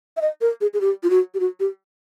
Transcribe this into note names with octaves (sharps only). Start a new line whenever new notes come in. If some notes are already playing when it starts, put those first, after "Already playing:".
E5
D#5
A#4
G#4
G#4
G4
F4
F#4
G4
F#4
G4